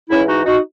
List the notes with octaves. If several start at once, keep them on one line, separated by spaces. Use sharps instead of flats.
G#2 E3 C#4 E4
D#4 F#4
D#4 F#4